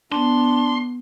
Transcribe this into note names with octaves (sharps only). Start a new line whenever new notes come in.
B3 D4 C6